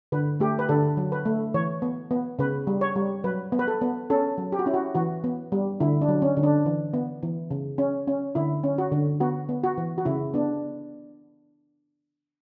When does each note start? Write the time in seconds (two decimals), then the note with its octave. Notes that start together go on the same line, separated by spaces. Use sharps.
0.12 D3 B4
0.40 A3 G4
0.59 B4
0.69 D3 A4
0.97 F#3
1.12 B4
1.25 A3
1.54 E3 C#5
1.82 B3
2.11 B3
2.39 C#3 B4
2.67 G3
2.81 C#5
2.95 G3
3.24 F#3 B4
3.52 B3
3.59 B4
3.68 A4
3.81 B3
4.10 C#4 A4
4.38 F#3
4.52 G4
4.59 F#4
4.66 C#4 E4
4.74 F#4
4.95 E3 F#4
5.24 B3
5.52 G3
5.80 D3 E4
6.01 D4
6.08 F#3
6.22 C#4
6.37 D3
6.43 D4
6.66 E3
6.94 B3
7.23 E3
7.51 C#3
7.78 C#4
8.08 C#4
8.35 D3 E4
8.63 C#4
8.78 F#4
8.92 D3
9.20 B3 F#4
9.49 B3
9.64 F#4
9.78 E3
9.98 F#4
10.05 C#3 E4
10.34 B3 D4